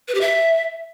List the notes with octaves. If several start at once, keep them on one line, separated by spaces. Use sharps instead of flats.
B4
G4
E5